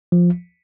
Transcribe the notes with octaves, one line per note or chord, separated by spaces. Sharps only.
F3